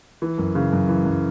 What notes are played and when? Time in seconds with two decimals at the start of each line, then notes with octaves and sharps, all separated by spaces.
0.22 E3
0.38 F#2
0.55 C#3
0.72 F#2
0.89 E3
1.05 F#2